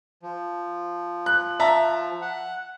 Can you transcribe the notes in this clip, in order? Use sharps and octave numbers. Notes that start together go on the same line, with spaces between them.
F3
F#6
E5 A5 A#5
F#5